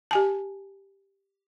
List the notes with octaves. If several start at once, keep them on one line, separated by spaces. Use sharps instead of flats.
G4 G#5 A5